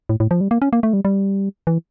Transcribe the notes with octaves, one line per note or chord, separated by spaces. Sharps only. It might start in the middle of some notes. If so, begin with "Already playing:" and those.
A2
A2
F3
G3
A#3
C#4
A#3
A3
G3
G3
E3